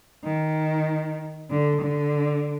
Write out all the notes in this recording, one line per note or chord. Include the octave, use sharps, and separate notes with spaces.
D#3
D3
D3